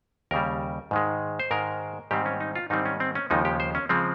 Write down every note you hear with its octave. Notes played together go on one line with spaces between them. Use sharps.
D#2 C#3 G3 A#4
G#2 D#3 G#3
C5
G#2 D#3 G#3 A#4
G#2 D#3 G3 C4 G4
C#4
D#4
F4
G#2 D#3 G3 C4 D#4
C#4
C4
C#4
D#2 C#3 F3 G#3 D#4
G4
C5
C#4
C#3 F3 G#3 C4